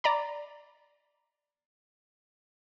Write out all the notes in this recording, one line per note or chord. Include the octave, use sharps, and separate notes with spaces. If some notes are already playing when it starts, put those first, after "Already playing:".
D5 A#5 B5